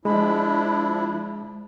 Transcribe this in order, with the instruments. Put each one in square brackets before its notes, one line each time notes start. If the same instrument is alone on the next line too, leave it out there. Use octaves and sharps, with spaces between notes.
[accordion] F3 D4 E4 [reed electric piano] G#3 [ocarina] B5